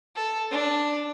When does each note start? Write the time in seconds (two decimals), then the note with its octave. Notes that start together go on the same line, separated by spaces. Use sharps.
0.16 A4
0.51 D4